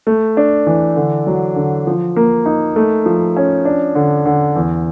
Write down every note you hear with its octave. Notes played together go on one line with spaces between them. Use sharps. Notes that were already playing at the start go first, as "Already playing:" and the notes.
A3
D4
E3
D3
F#3
D3
F3
A#3
D#4
A3
F3
C#4
D4
D3
D3
E2